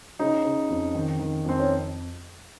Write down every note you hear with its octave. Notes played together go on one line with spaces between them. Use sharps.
C#3 D#4
C#3
F2
D#3
D#3
F2 C4
C#4